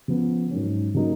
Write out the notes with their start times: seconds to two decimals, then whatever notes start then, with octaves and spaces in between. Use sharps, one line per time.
0.08 C#3 F3 B3
0.51 G#2 F#3 C#4
0.94 C#3 F#3 A#3 D#4